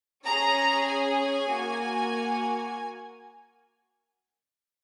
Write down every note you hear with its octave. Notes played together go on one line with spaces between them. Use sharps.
C#4 G#4 A#5
G#5
A#3 F#4